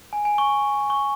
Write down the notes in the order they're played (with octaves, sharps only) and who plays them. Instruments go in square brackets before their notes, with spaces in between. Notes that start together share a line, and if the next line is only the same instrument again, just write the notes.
[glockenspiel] G#5
G#5
C#6
C#6